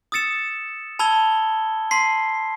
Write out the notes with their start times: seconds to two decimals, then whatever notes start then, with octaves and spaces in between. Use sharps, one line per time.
0.12 D#6 E6 A6 C#7 E7
0.99 A5 B5 E6 G#6 G7
1.91 A5 C6 B6 C7